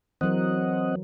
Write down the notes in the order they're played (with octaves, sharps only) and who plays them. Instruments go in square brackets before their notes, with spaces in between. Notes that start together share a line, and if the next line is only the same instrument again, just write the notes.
[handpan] E3 F#3 A#4 [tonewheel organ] C4 D#5 F#5